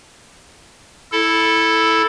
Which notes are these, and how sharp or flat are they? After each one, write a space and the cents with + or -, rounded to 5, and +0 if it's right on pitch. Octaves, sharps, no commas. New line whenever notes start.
E4 -5 A4 +0